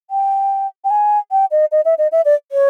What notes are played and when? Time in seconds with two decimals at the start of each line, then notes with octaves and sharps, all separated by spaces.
0.10 G5
0.84 G5
0.91 G#5
1.31 G5
1.51 D#5
1.72 D#5
1.85 E5
1.98 D#5
2.12 E5
2.25 D5
2.52 C#5